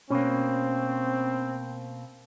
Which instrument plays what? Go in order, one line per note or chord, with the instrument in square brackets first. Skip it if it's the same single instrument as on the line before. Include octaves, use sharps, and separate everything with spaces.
[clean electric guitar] B2 A#3 [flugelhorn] C4 [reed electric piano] C#4